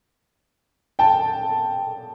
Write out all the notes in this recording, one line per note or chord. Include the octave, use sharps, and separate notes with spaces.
G5 A5